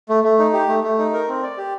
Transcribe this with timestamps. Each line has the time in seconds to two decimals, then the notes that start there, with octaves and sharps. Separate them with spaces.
0.09 A3
0.24 A3
0.39 D#4
0.53 G4
0.68 A3
0.84 A3
0.98 D#4
1.13 A#4
1.28 C4
1.43 D5
1.58 G4